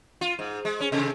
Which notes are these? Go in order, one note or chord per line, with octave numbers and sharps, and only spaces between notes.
F4
G#2
G#3
C#4
C3